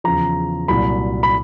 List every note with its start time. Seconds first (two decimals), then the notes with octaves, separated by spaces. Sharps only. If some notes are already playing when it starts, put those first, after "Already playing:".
0.04 E2 C#3 F3 A#5
0.68 C2 A#2 F#3 B5
1.23 B5